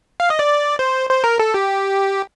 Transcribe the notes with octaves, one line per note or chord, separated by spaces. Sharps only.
F5
D#5
D5
C5
C5
A#4
A4
G4